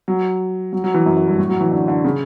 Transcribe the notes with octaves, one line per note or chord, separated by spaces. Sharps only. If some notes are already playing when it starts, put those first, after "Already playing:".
F#3
F#3
F#3
E3
F#2
F#2
G2
A2
F#3
E3
D3
D3
C#3